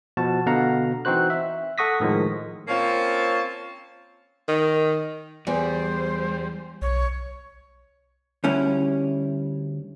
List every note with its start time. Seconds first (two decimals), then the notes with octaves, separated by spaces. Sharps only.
0.17 B2 F3 F#4 A5
0.46 B2 D3 B3 F5 F#5 A#5
1.05 E3 C4 D#4 F#4 C5 F#6
1.30 E5
1.78 A4 F#5 C#6 D#6 A#6 B6
2.00 A2 D#3 F3 G#3
2.68 A#3 C4 C#4 F4 A5
4.48 D#3
5.47 E2 G3 C5
6.82 B1 C#5
8.44 D2 G3 C#4 E4